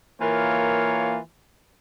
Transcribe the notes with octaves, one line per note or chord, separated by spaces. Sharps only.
E3 A#3 F4 A#4 C#5